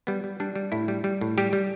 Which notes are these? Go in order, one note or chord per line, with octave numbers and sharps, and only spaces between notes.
G3 B3
G3
G3 D4
G3
A2 E4
G3
G3
A2
G3 G4
G3